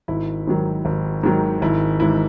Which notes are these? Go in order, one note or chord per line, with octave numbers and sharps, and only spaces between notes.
G#1 E4
G#2 D#3 F#3
G#1
G#2 D#3 F#3
G#1 E4
G#2 E3 E4